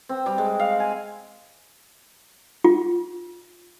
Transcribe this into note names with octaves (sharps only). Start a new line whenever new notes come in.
C4
G3
G#3
F5
G#5
F4